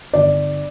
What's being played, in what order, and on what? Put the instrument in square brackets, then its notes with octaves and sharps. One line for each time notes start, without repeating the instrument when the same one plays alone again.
[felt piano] G1 D5